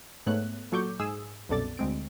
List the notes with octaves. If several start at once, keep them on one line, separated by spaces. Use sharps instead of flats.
G#2 A3 B3 C#5 F#6
A#2 F#3 A4 C#6 D6 G6
G#2 G#4 D#6 E6
C2 F#2 B2 A4 D5 A6
D2 G#3 C4 D7